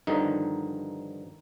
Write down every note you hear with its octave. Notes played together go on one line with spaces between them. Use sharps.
G2 D3 D#3 F3 D#4